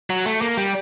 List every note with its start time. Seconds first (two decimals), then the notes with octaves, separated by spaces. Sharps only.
0.10 F#3
0.26 A3
0.42 A#3
0.57 G3